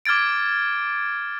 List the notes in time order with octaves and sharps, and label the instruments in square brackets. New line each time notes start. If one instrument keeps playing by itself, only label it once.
[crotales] D6 F6 G#6 A6 D7